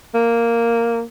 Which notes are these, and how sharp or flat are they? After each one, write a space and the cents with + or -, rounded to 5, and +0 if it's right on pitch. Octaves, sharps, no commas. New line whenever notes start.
A#3 -5